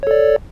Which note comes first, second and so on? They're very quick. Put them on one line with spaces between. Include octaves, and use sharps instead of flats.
C#5 A4 D5